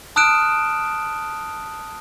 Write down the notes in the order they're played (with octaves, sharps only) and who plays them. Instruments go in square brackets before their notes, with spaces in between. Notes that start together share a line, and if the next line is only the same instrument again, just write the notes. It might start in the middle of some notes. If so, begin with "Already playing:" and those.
[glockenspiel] A5 D#6 F6 F#6 D7 E7